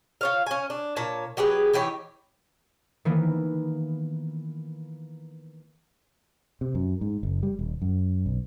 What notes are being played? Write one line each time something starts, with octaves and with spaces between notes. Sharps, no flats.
F4 C#5 F5
C#4 G#5
D4
A#2 C#5 A5
F#3 G4 G#4 B4
E3 D#4 G4 C#5
D#3 E3 A#3 B3
C3
F#2
G#2
F#1
G3
D#1
F#2
B1